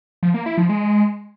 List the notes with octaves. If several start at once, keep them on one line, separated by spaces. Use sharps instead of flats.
F3
A#3
E4
F3
G#3